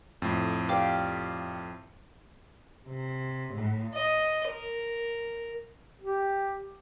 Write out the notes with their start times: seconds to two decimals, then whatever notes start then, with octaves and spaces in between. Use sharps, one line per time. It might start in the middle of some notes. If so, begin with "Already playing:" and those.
0.22 F2 A2
0.69 G4 D5 F5
2.88 C3
3.54 A2
3.94 D#5
4.48 A#4
6.01 G4